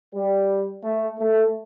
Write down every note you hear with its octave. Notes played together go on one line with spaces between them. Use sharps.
G3
A3
A3